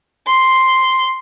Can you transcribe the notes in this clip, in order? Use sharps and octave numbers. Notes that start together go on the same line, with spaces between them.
C6